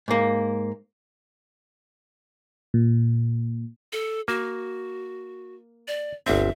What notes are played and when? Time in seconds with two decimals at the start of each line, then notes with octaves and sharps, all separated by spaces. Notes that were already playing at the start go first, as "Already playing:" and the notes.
0.08 G#2 A#3
2.74 A#2
3.93 A4
4.28 A#3 F#4
5.88 D5
6.26 G1 D2 C4 E5